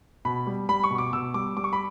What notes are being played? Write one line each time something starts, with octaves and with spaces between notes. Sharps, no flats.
B2 B5
G3
G3 B5
C#6
B2
D6
B2 E6
G3 D6
G3 D6
C#6
B5